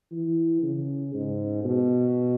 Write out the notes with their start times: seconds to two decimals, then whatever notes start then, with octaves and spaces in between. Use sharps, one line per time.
0.12 E3
0.63 C#3
1.14 G#2
1.65 B2